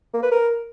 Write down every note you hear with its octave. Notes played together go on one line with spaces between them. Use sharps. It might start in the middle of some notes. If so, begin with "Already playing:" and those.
A#3
B4
A#4